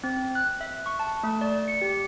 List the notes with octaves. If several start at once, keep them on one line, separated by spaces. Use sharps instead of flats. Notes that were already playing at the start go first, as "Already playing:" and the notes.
C4
F#6
E5
C#6
A5
A3
D5
C#7
G4